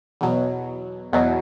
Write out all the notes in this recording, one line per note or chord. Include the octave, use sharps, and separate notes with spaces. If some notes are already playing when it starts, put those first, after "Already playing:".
E2 B2 F#3
E2 B2 F#3